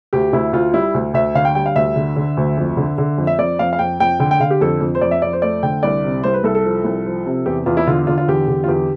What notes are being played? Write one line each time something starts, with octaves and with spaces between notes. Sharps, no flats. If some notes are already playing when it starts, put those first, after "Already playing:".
D2 G4
D2 E4
D2 F4
G3 E4
D2
D2 E5
D3 F5
G5
G3 G5
F5
D2 E5
D3
D3
D2
F2
D3
D3
F2
E5
F2 D5
F2 F5
F5
F2 G5
F2 G5
D3 G5
G5
D3 F5
G4
F2 A4
F2
C5
F2 D5
E5
F2 D5
C5
A3 D5
D3 G5
C2 D5
C3
C2 C5
B4
C2 A4
A4
F3
C2
F3
C3
E2 G4
E2 F4
E4
D3 F4
D3 F4
F4
E2 G4
D3
F4
E2 G4